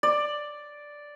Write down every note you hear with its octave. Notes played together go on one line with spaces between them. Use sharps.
D5